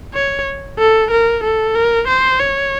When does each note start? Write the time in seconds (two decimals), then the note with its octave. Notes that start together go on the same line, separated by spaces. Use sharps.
0.14 C#5
0.79 A4
1.11 A#4
1.44 A4
1.75 A#4
2.08 C5
2.40 C#5